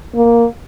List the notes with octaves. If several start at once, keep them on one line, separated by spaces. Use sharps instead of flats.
A#3